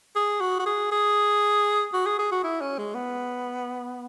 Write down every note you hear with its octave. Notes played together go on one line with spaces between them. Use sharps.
G#4
F#4
F#4
G#4
G#4
F#4
G#4
G#4
F#4
E4
C#4
G#3
B3